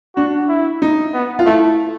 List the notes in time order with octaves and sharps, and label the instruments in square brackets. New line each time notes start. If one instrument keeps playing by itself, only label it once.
[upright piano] D4 [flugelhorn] F#4
[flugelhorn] E4
[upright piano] D#4
[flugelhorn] B3
[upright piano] F4
[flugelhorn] A3 [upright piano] E4